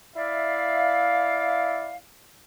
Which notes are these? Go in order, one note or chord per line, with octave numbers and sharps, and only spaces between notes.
E4 D5 E5 F5